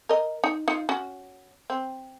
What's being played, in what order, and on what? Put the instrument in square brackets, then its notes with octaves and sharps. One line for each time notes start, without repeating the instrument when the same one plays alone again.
[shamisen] A#4 D#5
D#4
D#4 F4
C#4 F#4
C4